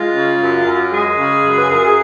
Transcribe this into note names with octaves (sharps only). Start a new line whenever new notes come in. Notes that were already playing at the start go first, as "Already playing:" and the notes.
Already playing: G#3 F4
C#3
F#2
F#2
G#3 G#4
C#3
F#2
B4
F#2 A#4
G#4